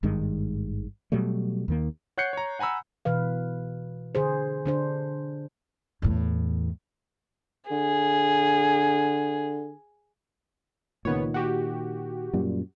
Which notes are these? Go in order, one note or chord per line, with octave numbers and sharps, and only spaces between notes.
G#1 G2 D#3 G#3
B2 F#3 G3 A3
D#2 D#3 A#3
C#5 F#5 F#6 G6 C7 C#7
C#5 A#5
F#5 G#5 A#5 B5 E6
B2 E3 B4 F5
D3 G#4 C5
D3 D4 C5
E2 A2
D3 G#4
C#2 A#2 D#3 B3 C#5
F#4 G4
F#2 A#2 G3